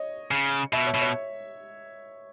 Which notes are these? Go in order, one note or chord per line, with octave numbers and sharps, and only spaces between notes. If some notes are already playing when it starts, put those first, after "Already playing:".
Already playing: C#5 D#5
C#3
B2 E5
C#5
B2
C#5